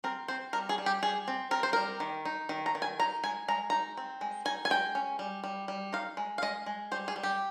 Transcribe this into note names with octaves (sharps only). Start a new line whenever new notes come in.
C4 A#4
C4 C5
G3 A#4
G#4
G3
G4
G3 G#4
C4
C4 A#4
C5
G3 A#4
D#3
D#4
D#3
A#5
D#3
G#5
D#4 A#5
G#3 G#5
G#3 A#5
D#4 A#5
C4
G#3
D#4 G#5
G#5
G#3 G5
C#4
G3
G3
G3
D#4 F5
G#3
F5
G#3 D#5
G#3
G3 C5
G#4
G3
G4